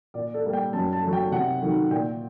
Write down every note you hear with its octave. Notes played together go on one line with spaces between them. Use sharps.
A#2 D5
A4
G3 A#3
G5
F#2 A5
A5
F#3 A3
G5
C3 F#5
D#3 F#3 A3
A#2 G5